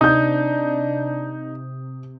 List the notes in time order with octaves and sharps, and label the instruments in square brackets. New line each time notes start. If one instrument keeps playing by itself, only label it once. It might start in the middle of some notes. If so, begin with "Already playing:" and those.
[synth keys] C3 [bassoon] D4 [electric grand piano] D#4 [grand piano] D#6 G6